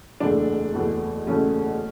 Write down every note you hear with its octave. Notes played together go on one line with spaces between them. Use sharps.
F#1 E2 B2 A3 D4
F#1 E2 B2 A3
F#1 E2 B2 A3 C#4